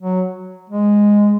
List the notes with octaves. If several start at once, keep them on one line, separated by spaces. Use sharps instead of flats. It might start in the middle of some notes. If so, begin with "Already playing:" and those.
F#3
G#3